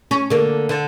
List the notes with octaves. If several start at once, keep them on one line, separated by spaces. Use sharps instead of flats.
C#4
D3 A#3
D3